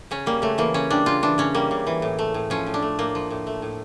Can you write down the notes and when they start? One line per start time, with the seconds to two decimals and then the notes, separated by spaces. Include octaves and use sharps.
0.11 C#3 C#4
0.26 G3 A#3
0.42 C#3 A3
0.58 E3 A#3
0.74 C#3 C#4
0.90 G3 D4
1.06 C#3 F4
1.22 E3 D4
1.38 C#3 C#4
1.55 G3 A#3
1.71 C#3
1.87 E3
2.02 A2
2.19 A3
2.34 A2
2.50 F3 C#4
2.66 A2
2.74 D4
2.82 A3
2.98 A2 A#3
3.15 F3
3.30 A2
3.47 A3
3.62 A2